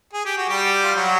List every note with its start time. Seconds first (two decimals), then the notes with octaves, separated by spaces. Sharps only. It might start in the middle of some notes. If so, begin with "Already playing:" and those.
0.13 G#4
0.25 G4
0.37 F#4
0.49 G3 G4
0.84 F4
0.95 F#3 F#4